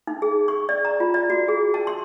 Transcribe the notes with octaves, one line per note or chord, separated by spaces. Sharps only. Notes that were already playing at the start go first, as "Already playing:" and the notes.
D#4
G#4
C#6
D5
A#5
F4
D5
F#4
G#4
A5
C6